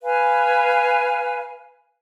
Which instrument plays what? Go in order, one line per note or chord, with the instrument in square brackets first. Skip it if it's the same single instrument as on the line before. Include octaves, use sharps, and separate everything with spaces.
[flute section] B4 F5 G#5